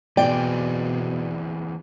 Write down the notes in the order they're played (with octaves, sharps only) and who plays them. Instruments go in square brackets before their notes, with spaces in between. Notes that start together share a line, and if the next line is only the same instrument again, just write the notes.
[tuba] B2 [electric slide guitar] E3 C4 G#4 [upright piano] D5 [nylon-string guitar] G5